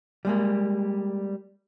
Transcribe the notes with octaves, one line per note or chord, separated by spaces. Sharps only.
G3 G#3 A#3